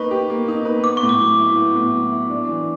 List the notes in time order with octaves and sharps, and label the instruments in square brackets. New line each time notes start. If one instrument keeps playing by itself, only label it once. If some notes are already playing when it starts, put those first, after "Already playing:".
Already playing: [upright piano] A#3 D#4 B4 [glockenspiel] C#6
[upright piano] G4
A#3
D#4
B4
[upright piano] B3 [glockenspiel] D6
[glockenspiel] C#6
[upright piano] A2
[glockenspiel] D6
[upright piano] F#3
E4
B3
A2
F#3
E4
D4
E3